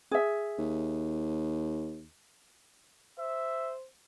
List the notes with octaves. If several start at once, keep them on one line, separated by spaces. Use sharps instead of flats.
G#4 E5
D#2
C5 E5